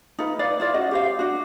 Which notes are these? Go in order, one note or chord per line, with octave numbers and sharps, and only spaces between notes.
D#4 F4 B4
D#4 B4 D5 F5
E4 F4 D5 F5
C#4 F#4 D#5
G4 C5 F5
D4 F#4